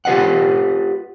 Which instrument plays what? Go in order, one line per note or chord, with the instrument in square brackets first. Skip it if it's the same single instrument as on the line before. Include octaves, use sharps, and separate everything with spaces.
[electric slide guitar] F4 G4 B4 D#5 F#5